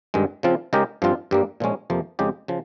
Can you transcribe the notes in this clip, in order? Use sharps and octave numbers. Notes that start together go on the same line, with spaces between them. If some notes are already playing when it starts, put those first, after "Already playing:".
G2 D#3 G#3
C#3 F3 C4 F4
C#3 G#3 D#4 G4 A#4
G2 F3 C4 F4
G2 G3 A#3
A#2 F3 G#3 C#4
F2 C3 F3 A#3
F2 C#3 G#3 D#4 G4
C#3 F3